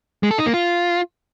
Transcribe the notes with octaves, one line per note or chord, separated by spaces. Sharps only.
G#3
A4
D#4
A#3
F4